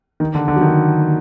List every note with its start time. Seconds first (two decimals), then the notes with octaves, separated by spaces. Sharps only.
0.20 D#3
0.35 D3
0.48 D3
0.56 F#3
0.61 D#3